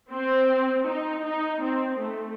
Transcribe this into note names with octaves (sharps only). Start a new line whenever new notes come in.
C4
D#4
D#4
C4
A3